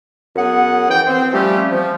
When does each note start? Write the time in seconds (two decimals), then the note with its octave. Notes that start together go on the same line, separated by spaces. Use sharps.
0.36 F#2 B3 G#4 F#5
0.90 E3 G5
1.07 C4
1.33 F3 G3 A3 C#4 G4
1.72 F3